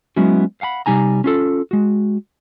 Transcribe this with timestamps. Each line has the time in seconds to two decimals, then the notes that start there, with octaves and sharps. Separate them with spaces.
0.16 F#3 G#3 B3 C#4 E4 F#4
0.61 F5 F#5 G#5 B5
0.86 C3 G3 D#4 G#5 A#5
1.24 C#4 F4 A4
1.71 G#3 F#4